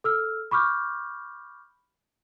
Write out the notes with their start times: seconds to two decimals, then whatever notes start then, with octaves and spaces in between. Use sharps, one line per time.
0.04 A4 E6 F6
0.51 B5 C#6 D6 F6 G6